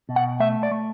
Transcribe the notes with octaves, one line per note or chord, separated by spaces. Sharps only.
B2
F#5
A3 E5
D5
A3